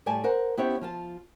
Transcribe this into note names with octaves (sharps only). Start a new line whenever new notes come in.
A2 G3 D5 G#5 A5
A#4 C5 F#5
B3 C#4 E4 G4 C5 C#5
F3 F4 A5